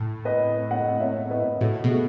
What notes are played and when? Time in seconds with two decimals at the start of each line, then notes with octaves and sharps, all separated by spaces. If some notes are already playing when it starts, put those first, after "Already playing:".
Already playing: A2
0.25 B4 D#5
0.71 D#5 F#5
1.00 C#5 E5
1.31 B4 D#5
1.61 A2 F#4 A4
1.84 B2 G#4
1.91 F#4 A4